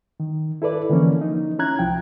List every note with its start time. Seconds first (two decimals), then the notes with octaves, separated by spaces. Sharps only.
0.20 D#3
0.62 E4 A4 B4 D5
0.89 D3 E3 F3 A#3 C#4
1.21 D#4
1.59 C#4 E4 A#5 F#6 G#6
1.79 C2 F3 G5